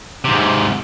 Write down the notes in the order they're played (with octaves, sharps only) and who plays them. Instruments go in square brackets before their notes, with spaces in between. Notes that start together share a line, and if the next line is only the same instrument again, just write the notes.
[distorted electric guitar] G#2 C3